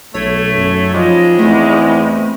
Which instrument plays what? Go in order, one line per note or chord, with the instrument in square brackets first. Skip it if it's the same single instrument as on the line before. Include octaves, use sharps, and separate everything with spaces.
[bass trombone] B1 [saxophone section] A3 [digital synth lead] C#5
[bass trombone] F#2
[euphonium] F3 [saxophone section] G3 G#3 D#4
[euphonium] E2 [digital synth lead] A3 [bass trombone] C4